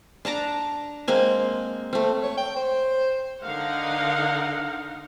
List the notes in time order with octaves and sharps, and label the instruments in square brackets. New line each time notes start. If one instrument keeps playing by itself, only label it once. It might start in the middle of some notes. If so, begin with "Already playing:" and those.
[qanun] D4 A5 A#5 D6
G#3 A#3 C4 G#5
A3 C4
[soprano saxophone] C#5
G5
C5
[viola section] D3 D#4 A#4 F5 F#5